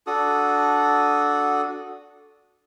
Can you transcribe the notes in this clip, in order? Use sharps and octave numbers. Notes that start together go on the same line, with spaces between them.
D4 F#4 A4 D#6